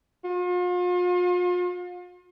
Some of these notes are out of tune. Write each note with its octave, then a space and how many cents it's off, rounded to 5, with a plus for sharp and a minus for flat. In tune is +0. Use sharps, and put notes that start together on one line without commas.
F4 +40